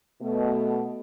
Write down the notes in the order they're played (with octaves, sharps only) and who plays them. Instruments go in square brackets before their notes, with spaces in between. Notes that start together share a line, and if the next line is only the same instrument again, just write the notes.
[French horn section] B2 A3